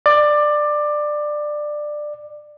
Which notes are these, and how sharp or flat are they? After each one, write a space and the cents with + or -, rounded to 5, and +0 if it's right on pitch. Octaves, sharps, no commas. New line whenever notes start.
D5 +15